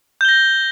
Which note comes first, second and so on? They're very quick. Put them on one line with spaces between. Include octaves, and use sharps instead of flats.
G6 G7 A#6